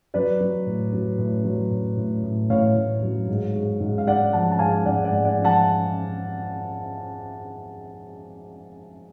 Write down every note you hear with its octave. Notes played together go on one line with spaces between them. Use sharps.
F#3 B4 D5
F#3
A2
F#3
A2
F#3
A2
A2
A2
A2 C#5 F5
A2
F#3
G#2
G#2
G#2
F5
G#2 D5 F#5
F3 F#5 A5
A5
G#2 F5 G#5
G#2 D5 F#5
D5 F#5
G#2
D5 F#5
F3
F#5 A5